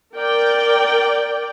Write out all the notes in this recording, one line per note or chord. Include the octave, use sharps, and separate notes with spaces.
A#4 D5 G5